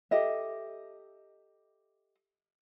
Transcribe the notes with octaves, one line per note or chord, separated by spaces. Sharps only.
G4 A4 D#5 E5